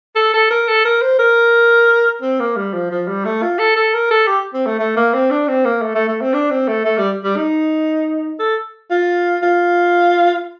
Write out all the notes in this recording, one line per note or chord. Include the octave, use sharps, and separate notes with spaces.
A4
A4
A#4
A4
A#4
C5
A#4
C4
A#3
G3
F3
F3
G3
A3
F4
A4
A4
A#4
A4
G4
C4
A3
A3
A#3
C4
D4
C4
A#3
A3
A3
A3
C4
D4
C4
A3
A3
G3
G3
D#4
A4
F4
F4